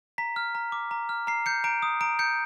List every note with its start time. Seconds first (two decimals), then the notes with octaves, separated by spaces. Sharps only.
0.18 A#5 B6
0.36 F6
0.55 A#5
0.72 D6
0.91 A#5
1.09 F6
1.27 A#5 C7
1.46 G6 C#7
1.64 A#5 D7
1.82 D#6
2.01 A#5 D7
2.19 G6 C#7